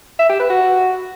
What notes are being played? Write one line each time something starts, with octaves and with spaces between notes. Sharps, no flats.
E5
G4
B4
F#4